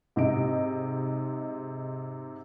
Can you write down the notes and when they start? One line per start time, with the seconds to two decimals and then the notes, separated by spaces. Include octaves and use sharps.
0.16 G#2 C3 D#5 D7